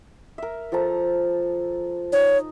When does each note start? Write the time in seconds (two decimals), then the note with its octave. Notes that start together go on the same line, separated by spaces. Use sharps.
0.38 A#4 E5
0.72 F3 A4 A#5
2.12 D#4 C#5